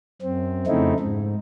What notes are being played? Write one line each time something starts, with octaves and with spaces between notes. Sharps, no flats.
F#2 C4
F2 C#3 A3 C4 D#4 E4
G#2